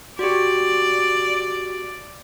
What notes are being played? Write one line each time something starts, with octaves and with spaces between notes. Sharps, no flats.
F#4 G4 D5